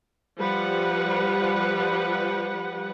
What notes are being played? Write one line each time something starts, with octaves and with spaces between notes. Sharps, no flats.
F3 G3 G4 B4 F#5